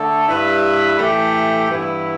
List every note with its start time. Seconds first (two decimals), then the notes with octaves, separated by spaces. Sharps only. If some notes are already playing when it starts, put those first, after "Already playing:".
Already playing: D3 A3 A4
0.28 G2 G3 E4 B4
0.98 A2 E3 A3 G4
1.68 G2 E3 B3 E4